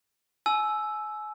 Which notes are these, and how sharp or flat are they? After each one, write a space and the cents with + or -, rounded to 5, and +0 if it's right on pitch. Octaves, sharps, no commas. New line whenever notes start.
G#5 +35 E6 +0